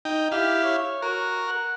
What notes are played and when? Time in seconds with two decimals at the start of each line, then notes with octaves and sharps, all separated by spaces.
0.05 D#4 G5
0.32 E4 G4 F5
0.63 C#5
1.02 F#4 A#4
1.48 F#5